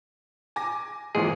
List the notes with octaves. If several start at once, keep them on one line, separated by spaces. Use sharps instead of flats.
G#5 D6 A#6
G#1 A#2 E3 G#3 G#4